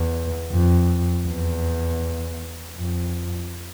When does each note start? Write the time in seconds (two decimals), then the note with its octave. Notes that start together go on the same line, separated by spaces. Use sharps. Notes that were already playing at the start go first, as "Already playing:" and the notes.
Already playing: E2
0.52 F2
1.27 E2
2.76 F2